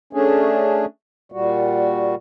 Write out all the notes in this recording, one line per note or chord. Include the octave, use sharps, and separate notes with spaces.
A3 C#4 D4 G#4
A#2 G3 F#4